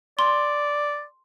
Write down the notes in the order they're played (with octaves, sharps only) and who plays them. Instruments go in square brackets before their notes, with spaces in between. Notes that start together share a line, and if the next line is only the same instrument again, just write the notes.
[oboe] D5 [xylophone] C6